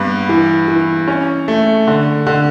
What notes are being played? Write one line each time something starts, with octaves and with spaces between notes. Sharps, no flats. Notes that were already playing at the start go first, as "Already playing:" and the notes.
Already playing: G2 B3
E3
E3
C#4
A3
D3
D3